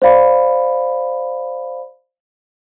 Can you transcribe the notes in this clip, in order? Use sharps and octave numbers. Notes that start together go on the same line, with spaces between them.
C5 D5 F5 B5